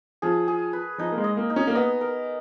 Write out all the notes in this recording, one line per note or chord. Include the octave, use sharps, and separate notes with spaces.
F3 G#4
G#4
B4
F3 D#4
A#3
G#3
D#5
A#3
D#4
C#4
A#3
B3 D#5
A#4